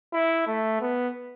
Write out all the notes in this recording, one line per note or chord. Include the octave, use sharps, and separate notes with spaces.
E4
A3
B3